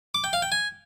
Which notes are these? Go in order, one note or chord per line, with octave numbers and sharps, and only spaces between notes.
D6
G5
F5
G5
G#5